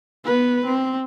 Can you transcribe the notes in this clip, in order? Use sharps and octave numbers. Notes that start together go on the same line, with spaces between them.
B3 B4
C4